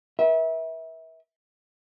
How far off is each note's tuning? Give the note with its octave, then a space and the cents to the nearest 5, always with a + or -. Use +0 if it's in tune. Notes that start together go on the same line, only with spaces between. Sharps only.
B4 -45 E5 -25